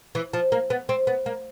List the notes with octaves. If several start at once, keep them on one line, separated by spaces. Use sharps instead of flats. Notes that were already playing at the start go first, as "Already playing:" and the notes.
E3
F3
A#3
B3
C4
B3
A#3